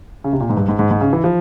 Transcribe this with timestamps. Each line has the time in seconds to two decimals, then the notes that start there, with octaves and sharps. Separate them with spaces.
0.24 C#3
0.33 C3
0.40 A#2
0.50 G#2
0.57 G2
0.68 G#2
0.79 G#2
0.91 G#2
1.01 C#3
1.13 E3
1.24 F3